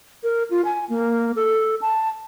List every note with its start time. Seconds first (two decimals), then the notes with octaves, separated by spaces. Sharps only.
0.23 A#4
0.50 F4
0.65 G#5
0.89 A#3
1.36 A4
1.81 A5